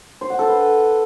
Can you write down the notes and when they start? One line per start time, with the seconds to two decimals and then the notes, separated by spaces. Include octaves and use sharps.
0.21 C5
0.30 F#5
0.39 A4
0.48 B4